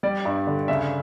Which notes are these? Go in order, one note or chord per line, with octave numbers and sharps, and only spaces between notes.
G3 D5
G2
D3
C#3 E5